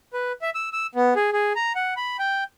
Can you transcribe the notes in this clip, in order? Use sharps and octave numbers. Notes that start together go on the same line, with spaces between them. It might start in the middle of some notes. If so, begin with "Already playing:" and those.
B4
E5
E6
E6
B3
G#4
G#4
A#5
F#5
B5
G5